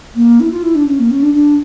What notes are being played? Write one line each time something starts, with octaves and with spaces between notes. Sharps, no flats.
A#3
E4
F4
E4
D4
C#4
A#3
C#4
D4
D4